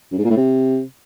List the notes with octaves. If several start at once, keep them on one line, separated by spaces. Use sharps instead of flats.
F#2
G#2
A#2
A2
C3